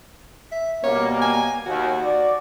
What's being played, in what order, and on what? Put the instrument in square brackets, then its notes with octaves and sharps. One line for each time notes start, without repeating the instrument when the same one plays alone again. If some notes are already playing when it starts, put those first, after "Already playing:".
[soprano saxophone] E5
[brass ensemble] B2 G3 A#3 [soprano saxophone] C#5
[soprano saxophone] G#5
[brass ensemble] D#2 [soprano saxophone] F#4
[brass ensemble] D5